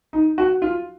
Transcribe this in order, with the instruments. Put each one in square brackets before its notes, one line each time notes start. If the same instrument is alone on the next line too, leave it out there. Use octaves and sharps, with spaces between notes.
[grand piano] D#4
F#4
F4